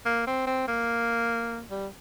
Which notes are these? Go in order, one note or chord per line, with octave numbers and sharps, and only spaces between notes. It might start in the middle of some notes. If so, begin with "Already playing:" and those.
A#3
C4
C4
A#3
G3